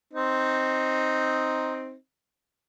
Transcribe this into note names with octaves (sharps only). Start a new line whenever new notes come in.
C4 D#4